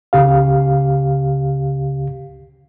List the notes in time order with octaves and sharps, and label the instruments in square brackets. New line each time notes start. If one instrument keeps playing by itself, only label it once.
[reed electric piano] C#2 C#3 G4 F5